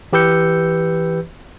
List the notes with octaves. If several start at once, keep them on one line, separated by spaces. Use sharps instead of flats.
E3 G4 B4 E6 G6 C#7